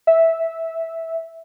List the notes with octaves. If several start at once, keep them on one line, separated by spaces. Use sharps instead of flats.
E5